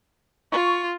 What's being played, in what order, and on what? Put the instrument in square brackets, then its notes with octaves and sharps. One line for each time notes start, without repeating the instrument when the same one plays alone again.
[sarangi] F4 [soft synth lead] C#6